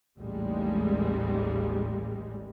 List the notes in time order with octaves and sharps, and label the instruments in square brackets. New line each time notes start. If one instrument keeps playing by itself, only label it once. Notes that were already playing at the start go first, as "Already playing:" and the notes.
[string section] A1 D#2 G3 G#3